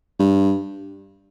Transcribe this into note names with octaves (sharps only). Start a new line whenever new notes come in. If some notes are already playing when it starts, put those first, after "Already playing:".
G2